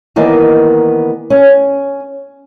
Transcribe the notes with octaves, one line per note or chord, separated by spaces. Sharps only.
D#3 E3 A#3 B3 D5 D#5
C#4